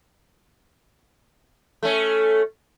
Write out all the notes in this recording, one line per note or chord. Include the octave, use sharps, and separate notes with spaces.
A3 C#4